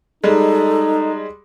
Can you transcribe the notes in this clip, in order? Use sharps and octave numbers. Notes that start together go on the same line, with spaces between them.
G3 G#3 D#4 A4